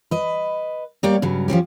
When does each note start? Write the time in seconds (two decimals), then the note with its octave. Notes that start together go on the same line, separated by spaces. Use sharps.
0.11 B4 D#5
1.03 G3 A#3 G4 C#5 D5
1.22 G2 C#3 F#3
1.48 F3 F#3 C#4 G4